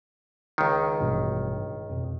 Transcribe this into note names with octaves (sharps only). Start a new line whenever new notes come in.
C#2 D#3
A1 G2 B2
F2 B2